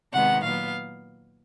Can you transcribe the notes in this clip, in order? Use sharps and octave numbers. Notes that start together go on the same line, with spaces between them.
C3 D#3 G#3 B3 F#5
A#2 F#3 B3 F5